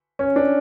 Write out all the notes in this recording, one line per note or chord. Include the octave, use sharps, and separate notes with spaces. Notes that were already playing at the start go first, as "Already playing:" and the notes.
C#4
D4